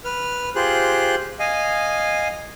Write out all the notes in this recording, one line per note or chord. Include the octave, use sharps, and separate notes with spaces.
B4 F6
F4 G4 G#4 C5 F#6
D#5 F5 G#5